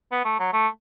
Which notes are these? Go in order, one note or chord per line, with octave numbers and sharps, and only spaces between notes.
B3
A3
F#3
A3